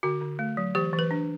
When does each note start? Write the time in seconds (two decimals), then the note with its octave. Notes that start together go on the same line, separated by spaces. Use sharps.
0.03 D3 F#4
0.22 D3
0.39 A3
0.57 F#3
0.75 E3 G4
0.93 E3
0.99 B4
1.11 D4